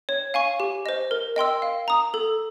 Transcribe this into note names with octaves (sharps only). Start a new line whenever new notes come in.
C#5
F5 G#5 C#6
G4
C5 D#5
A#4
D#5 G5 C6 E6
F5
A#5 D#6
A4